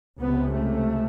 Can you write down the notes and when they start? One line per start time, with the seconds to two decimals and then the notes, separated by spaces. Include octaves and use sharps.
0.20 C#2 C3 B3
0.53 A3